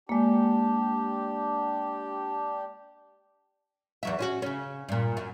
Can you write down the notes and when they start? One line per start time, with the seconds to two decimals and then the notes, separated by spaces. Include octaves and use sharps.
0.09 G#3 A#3 D4 G4
4.03 E2 F#3 E5
4.19 C#4 F4 F#4
4.42 C#3 C#4
4.89 G2 A#2
5.17 F#2